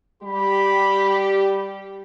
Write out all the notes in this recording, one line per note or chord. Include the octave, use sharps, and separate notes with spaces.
G3 G4 B5